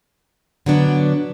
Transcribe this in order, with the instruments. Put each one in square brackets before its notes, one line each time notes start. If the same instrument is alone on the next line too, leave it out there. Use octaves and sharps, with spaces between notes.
[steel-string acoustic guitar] D3 F#3 B3 D4